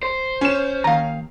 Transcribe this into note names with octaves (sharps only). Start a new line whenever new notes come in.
C5
C#4 E7
D#2 D#3 F5 A#5